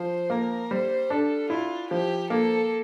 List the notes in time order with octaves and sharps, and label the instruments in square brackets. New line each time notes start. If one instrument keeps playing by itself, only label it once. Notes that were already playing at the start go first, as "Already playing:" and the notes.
Already playing: [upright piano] F3 [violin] C5
[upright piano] A#3 [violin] A#4
[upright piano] G3 [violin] C5
[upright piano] D4 [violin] A4
[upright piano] E4 [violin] F4
[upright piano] F3 [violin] G4
[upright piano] A#3 [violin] A4